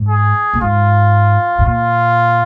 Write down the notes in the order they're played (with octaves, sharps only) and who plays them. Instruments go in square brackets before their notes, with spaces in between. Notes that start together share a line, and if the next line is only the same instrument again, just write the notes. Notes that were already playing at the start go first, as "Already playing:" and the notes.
Already playing: [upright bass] G#2
[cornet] G#4
[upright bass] A#2
[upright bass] G#2 [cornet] F4
[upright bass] G#2
[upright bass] A#2 [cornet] F4